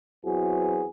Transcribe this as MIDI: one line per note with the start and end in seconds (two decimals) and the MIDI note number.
0.25 0.87 40
0.25 0.87 52
0.25 0.87 54
0.25 0.87 60
0.25 0.87 66
0.25 0.87 68